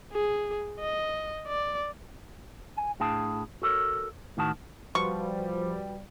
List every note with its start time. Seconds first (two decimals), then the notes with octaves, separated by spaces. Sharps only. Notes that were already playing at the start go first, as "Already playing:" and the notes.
0.13 G#4
0.80 D#5
1.47 D5
2.77 G#5
3.00 A2 D4 G#4 F5 G5 A5
3.62 F#4 A4 A#4 C#5
4.37 A2 D#3 F#4 A5
4.95 F3 G3 F#4 B4 C#6